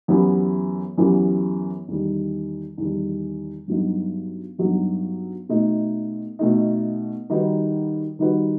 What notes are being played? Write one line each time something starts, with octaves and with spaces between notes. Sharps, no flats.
F#2 E3 B3 E4 G4
F#2 E3 B3 E4 G4
E2 D#3 G3
E2 D#3 G3
G2 F#3 B3 D#4
G2 F#3 B3 D#4
B2 A3 D#4
B2 A3 D#4
D#3 G3 D#4 F#4 B4
D#3 G3 D#4 F#4 B4